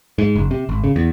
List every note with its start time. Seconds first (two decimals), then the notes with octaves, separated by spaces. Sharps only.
0.18 G#2
0.36 F#1
0.51 C3
0.69 G#1
0.84 C#3
0.96 E2